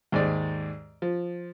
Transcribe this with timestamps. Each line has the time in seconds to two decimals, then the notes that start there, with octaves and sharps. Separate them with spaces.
0.12 D#2 G#2 G#3 D5
1.02 F3